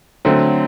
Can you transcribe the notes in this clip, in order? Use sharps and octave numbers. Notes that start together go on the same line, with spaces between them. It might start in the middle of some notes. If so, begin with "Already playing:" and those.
D3 F#3 A3 C4